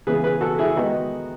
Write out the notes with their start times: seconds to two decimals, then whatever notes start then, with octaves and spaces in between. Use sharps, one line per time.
0.07 C#3 E3 B3 G#4 B4
0.24 G#4 B4
0.41 F#4 A4
0.59 E4 G#4
0.76 D#3 G#3 B3 D#4 F#4